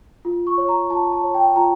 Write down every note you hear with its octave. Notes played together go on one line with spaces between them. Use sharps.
F4
C#6
C#5
A#5
F4 A5
A5
C#5
G5
F4 A#5